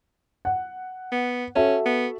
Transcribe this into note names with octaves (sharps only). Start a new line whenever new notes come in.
F#5
B3
C#4 F#4 A4 E5
B3